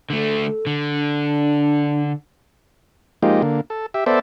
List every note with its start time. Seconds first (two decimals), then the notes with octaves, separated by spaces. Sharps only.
0.10 D3 A3 A4
0.67 D3
0.92 D4
3.23 F3 G#3 A#3 D#4 G4
3.42 D3 A#3
3.70 A4
3.94 G4 E5
4.06 B3 A4 C5 D5 E5